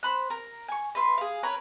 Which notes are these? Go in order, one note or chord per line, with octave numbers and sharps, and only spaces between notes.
C5 B5 F#6
A#4
G#5 C#6
B4 E5 C6
G#4 F5
C#4 A#4 B4 C#5